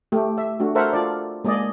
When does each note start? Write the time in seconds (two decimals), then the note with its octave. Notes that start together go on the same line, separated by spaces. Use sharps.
0.12 A3 G4
0.38 E5
0.60 A3 D4 F#4
0.75 A4 A#4 C5 E5 F#5
0.93 F4 A4 D5
1.45 G#3 A#3 G#4 D5 D#5